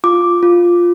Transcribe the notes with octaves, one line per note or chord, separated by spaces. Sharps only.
F4 D6
F4